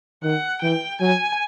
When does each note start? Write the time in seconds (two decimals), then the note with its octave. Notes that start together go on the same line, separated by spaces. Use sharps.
0.24 D#3 F#5
0.62 E3 G5
1.01 F#3 G#5